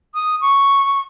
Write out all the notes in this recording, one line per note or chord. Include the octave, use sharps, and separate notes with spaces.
D#6
C#6